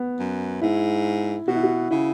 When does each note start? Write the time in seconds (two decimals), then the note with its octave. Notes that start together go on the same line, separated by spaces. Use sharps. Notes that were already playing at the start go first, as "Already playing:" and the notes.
Already playing: B3
0.20 F#2
0.61 G#2 E4
1.47 B2 F#4
1.55 E4
1.64 F#4
1.91 C#3 E4